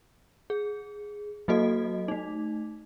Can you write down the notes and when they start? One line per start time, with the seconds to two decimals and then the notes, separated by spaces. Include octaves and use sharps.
0.50 G#4
1.48 F#3 A#3 F#4 A4 D#5
2.08 A3 D#4